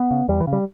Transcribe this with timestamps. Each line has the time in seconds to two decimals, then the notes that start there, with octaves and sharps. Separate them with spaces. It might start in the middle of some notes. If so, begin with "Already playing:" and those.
Already playing: B3
0.11 C#3
0.28 E2 G3
0.41 E3
0.47 C#3
0.53 G3